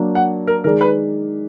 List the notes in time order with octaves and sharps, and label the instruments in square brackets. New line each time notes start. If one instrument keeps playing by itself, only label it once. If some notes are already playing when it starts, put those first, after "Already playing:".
Already playing: [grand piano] F#3 A#3 D4
[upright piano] F#5
A#4
[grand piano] D#3 G#3 D#4 G#4 D5 [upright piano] A#4
[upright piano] B4